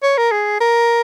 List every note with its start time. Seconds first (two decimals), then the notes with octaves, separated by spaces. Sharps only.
0.03 C#5
0.18 A#4
0.32 G#4
0.60 A#4